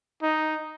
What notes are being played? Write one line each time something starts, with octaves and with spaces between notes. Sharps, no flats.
D#4